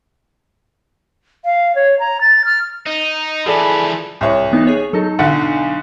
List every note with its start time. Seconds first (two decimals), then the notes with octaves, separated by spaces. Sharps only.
1.45 F5
1.75 C#5
1.99 A#5
2.21 A6
2.45 F6
2.86 D#4
3.46 E3 F3 G#4 A4 D5 B5
4.21 C2 C#5
4.52 E3 B3 D#4
4.67 G#4 C#5
4.93 F#3 D#4 A4
5.19 B1 D3 F#5